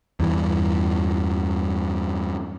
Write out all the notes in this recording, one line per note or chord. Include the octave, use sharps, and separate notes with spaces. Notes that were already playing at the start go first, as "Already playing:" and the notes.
E2 G2 E3